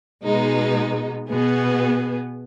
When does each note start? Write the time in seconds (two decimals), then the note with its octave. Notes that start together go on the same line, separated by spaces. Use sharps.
0.25 B2 G#3 B3 D#4
1.30 B2 B3 G#4